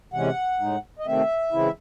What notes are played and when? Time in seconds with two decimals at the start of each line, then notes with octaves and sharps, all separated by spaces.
0.14 C3 E3 G#3 C#4 F#5
0.60 A2 G#3 D#4
0.99 D#5
1.06 C3 D#3 A3 C4 E5
1.52 C#3 E3 G#3 C4 E4